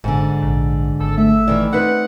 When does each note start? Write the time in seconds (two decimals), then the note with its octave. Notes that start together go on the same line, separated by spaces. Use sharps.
0.04 G1 G#2 D3
0.42 A#1
1.00 G#1 A4
1.17 A3 E5
1.48 D#3 E3 D5
1.73 C4 D#4 B4 F#5